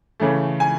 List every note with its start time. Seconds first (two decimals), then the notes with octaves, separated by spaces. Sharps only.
0.20 C#3 E3 A3
0.60 G#5